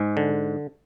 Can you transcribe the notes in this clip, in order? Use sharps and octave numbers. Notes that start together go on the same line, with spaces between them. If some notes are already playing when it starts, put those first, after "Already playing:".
Already playing: G#2 G#3
D3